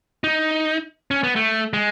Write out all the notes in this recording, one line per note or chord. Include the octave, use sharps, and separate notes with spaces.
D#4
C#4
B3
A3
G#3